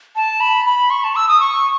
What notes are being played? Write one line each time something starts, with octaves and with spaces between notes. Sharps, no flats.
A5
B5
B5
C#6
A5
E6
D#6
C#6